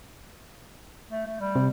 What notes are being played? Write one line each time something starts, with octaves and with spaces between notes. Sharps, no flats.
A3
A3
G3
C3